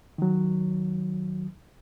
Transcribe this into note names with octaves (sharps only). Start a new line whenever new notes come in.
D#3 F#3